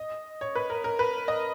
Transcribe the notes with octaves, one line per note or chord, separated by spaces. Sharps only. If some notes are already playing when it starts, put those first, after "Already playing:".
Already playing: D#5
C#5
B4
A#4
A#4
B4
D#5